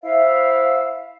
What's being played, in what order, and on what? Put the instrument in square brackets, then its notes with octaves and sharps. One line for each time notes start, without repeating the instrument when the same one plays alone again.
[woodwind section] E4 C5 E5 F5